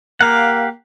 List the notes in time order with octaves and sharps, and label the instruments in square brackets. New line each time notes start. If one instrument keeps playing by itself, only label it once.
[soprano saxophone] A#3 [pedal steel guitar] G4 F5 F#5